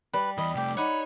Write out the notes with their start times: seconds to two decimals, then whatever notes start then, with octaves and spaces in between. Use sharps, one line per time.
0.13 G3 B4
0.38 E2 E3 D#5 B5
0.55 C3 A3 G4 G5 D6
0.77 D#4 C#5 F#5 B5